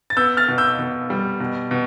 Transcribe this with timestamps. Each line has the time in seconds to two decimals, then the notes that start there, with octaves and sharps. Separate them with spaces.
0.10 A6
0.17 B3 E6 G6
0.37 F6 A6
0.48 B2
0.58 E6 G6
0.79 B2
1.10 G3
1.40 B2
1.71 B2